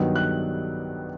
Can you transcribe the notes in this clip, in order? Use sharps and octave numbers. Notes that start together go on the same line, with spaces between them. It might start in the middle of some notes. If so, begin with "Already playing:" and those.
Already playing: G2 D#3 F#3 B3
F#6